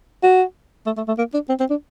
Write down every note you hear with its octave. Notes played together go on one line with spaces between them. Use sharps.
F#4
A3
A3
A3
A#3
D4
C4
C4
D4